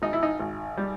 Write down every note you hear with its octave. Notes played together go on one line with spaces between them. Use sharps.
G#1 D#4
E4
D#4
G#1
G3